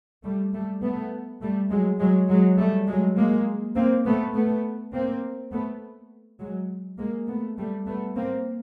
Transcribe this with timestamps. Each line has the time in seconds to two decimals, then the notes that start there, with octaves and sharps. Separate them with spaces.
0.24 G3 A3
0.53 G3 A3
0.82 A3 B3
1.41 G3 A3
1.70 F#3 G#3
2.00 F#3 G#3
2.29 F#3 G#3
2.58 G3 A3
2.88 F#3 G#3
3.17 G#3 A#3
3.75 A#3 C4
4.05 A3 B3
4.34 A3 B3
4.93 A#3 C4
5.52 A3 B3
6.40 F#3 G#3
6.98 G#3 A#3
7.28 A3 B3
7.58 G3 A3
7.87 A3 B3
8.16 A#3 C4